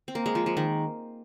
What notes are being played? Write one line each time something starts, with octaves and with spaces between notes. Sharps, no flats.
C4
A#3
G#3
F3
F3
D#3